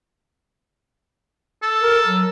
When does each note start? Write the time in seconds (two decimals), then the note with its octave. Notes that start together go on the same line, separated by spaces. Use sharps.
1.62 A4
1.83 A#4
2.05 F#3